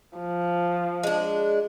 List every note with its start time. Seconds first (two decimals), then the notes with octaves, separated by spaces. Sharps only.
0.18 F3
1.03 G#3 D4